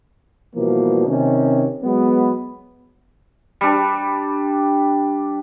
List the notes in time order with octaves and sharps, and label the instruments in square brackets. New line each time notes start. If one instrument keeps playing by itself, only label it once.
[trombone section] B2 E3 F3 G3 A#3
C3 D#3 C#4
F#3 G#3 B3
[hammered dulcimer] G3 D4